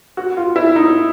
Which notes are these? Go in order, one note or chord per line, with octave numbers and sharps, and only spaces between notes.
F#4
F4
E4
D#4